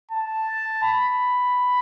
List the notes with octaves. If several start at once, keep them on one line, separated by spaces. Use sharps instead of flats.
A5
B5